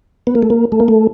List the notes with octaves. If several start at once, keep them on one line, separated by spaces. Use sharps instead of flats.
B3
A#3
A3
A#3
A3
A#3
A3